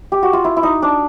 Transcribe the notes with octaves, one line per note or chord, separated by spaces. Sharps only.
G4
F#4
F4
E4
E4
D#4
D4